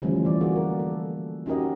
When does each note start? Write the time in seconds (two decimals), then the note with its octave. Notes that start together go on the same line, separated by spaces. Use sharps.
0.02 D3 E3 F3 G3 A3 C#4
0.25 E3 D5
0.41 A#3 F#4 G#4
0.56 A#4
0.79 A4
1.46 C#4 D#4 F#4 G4 A#4 D#5